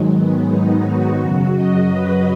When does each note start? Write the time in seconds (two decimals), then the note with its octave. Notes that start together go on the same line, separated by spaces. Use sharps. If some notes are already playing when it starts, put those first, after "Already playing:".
Already playing: G#2 D#3 F#3 G#3
0.11 B3
0.47 D#4
0.83 F#4
1.18 F#2 C#3 F#3
1.55 D#5
1.91 B4